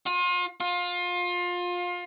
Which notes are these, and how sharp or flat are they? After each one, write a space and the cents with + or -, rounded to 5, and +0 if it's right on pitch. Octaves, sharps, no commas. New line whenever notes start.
F4 +35
F4 +25